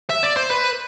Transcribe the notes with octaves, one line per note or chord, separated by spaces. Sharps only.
E5
D5
C5
B4